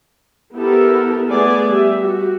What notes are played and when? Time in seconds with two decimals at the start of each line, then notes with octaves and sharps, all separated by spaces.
0.56 B3 E4 G4 A4 A#4
1.31 A3 B3 G#4 D5 G#5
1.69 G3 G4 E5
2.02 F#4 G4